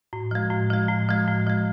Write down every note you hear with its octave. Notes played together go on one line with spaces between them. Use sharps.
A2
F3 G#3
A2
F3 G#3
A2
F3 G#3
A2
F3 G#3